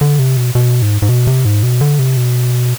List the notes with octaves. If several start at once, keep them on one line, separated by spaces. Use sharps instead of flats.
D3
C3
B2
B2
G#2
G#2
B2
C3
G#2
B2
D3
C3
B2